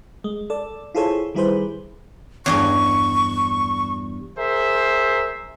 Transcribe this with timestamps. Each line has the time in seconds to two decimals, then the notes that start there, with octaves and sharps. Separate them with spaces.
0.24 G#3
0.50 A4 D5
0.95 E4 F4 G#4 A4 C5 C#5
1.35 D#3 G3 E4 G#4 B4 C5
2.46 E2 G2 D#5 C#6
4.38 G#4 A#4 C5 E5